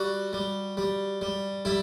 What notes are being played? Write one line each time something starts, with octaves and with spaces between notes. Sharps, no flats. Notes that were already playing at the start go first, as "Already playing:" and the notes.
Already playing: G3 F#4
G3
G3
G3
G3 E4